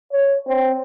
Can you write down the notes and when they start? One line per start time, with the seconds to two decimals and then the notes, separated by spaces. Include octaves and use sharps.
0.12 C#5
0.47 C4